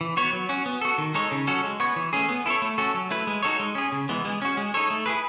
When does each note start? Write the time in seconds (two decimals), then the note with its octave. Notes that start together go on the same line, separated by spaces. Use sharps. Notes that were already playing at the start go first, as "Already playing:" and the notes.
0.01 E3
0.17 B3 F#4 C#5
0.33 F#3
0.49 C#4 F#4
0.66 B3
0.81 F#4 A4
0.98 D#3
1.14 G#3 D#4 A4 C#5
1.31 C#3
1.47 F#3 C#4 F#4 A4
1.64 G#3
1.80 B3 F#4 C#5
1.96 E3
2.13 A3 C#4 G#4
2.29 B3
2.46 E4 A4 C#5
2.62 A3
2.78 C#4 F#4 A4
2.94 F#3
3.11 A3 E4 B4
3.27 G#3
3.43 D#4 F#4 A4 C#5
3.60 G#3
3.75 C#4 G#4
3.92 C#3
4.09 E3 G#3 B3
4.25 G#3
4.42 C#4 F#4
4.57 G#3
4.74 D#4 A4 C#5
4.90 A3
5.06 E4 G#4 B4